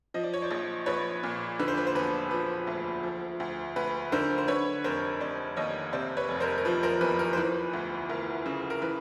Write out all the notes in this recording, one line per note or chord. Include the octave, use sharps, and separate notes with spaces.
F3 D#5
D5
C#5
C5 D5
A#1
A#1 B4 C#5
A#2
D3 B4
C5
B4
C5
E1 B4
F3 B4
D2
F3
D2
D2 B4
D3 A#4 C5
C5
D3 B4 C#5
F1 A#4 C5
F1 C5 D5
D#2 C#5 D#5
C3 C5 D5
B4 C#5
F1
A#4 C5
A#4
F3 B4
A#4 C5
E2 B4
A#4
C5
E3 B4
D2
D2 A#4
C#3
A#4
E3 B4